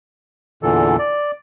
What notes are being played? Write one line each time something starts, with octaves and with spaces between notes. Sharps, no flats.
E2 A#2 D3 E3 A4
D5